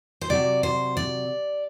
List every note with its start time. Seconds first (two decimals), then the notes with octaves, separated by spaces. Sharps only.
0.21 C5
0.29 C3 F#3 D5
0.63 C5
0.97 D5